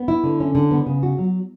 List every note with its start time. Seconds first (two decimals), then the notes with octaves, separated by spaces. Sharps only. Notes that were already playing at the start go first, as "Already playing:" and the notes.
Already playing: B3
0.08 E4
0.23 D3
0.40 C#4
0.55 D3
0.71 B3
0.86 C#3
1.03 F#4
1.18 F#3